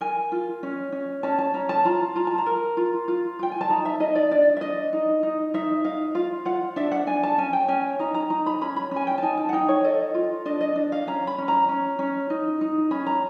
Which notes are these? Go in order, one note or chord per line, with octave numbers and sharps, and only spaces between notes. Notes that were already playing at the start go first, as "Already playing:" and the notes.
A#4 G#5
F4
C#4
C#4
C#4 A5
A5
C#4 A#5
A5
F4 A#5
F4 A#5
A5
A#5
A#4
F4
F4
F4 G5
G#5
A5
D#4 A#5
E5
D#4 D#5
D5
D4 D5
E5
D4 D#5
D#4
D#4
D#4 E5
D#4 F5
F4 F5
F4 F#5
D4 E5
F#5
D4 G#5
A5
C#4 G#5
G5
C#4 G#5
D#4 A#5
A#5
D#4 A#5
B5
C#4 B5
B5
C#4
G#5
G5
A5
D#4 G#5
A5
F#5
D#4 G5
C#5
A4 D#5
F4
D4 D#5
D#5
D4
F5
C#4 A#5
B5
C#4
A#5
C#4
C#4
D#4
D#4
C#4 B5
A#5